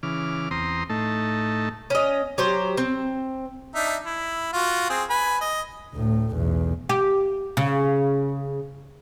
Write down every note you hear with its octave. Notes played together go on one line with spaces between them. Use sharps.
C#3 E3 D6 F6
E2 C4 A#5 C6 D#6
A2 A3 D#4 A5
C#4 D#5
F#3 G4 C5
C4
D4 D#4 E5
E4
F4 F#4
C4 G#4
B4 G#5 B5
D#5
D2 A2
B1 E2
G4
C#3